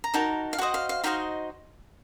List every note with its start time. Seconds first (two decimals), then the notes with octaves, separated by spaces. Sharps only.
0.04 A#5
0.14 D#4 F#4 A#4 A5
0.53 F5
0.58 F#4 C5 D#5 F#5
0.74 F5
0.89 F5
1.04 D#4 F#4 C5 D#5 F5